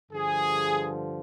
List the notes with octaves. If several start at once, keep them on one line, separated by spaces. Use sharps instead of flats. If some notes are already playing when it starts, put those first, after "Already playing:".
G2 D3 F3 G#4